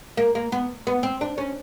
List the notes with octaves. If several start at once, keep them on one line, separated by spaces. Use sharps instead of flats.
A#3
A#3
B3
B3
C4
D4
C#4